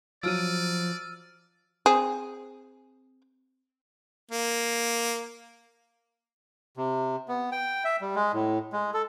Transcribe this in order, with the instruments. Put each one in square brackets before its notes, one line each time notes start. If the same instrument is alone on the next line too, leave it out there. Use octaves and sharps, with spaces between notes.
[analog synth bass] F3 [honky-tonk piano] F#3 D7 [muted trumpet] D5 [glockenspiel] E6 F6 D#7
[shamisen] C4 G#4
[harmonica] A#3
[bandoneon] C3
B3
G5
E5
G3
G#3
A2
G#3
A4